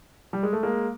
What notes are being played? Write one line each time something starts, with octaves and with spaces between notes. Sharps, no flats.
G3
G#3
A3
G#3 A#3